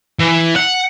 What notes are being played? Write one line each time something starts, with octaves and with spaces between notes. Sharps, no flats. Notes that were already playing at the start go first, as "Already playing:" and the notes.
E3
F#5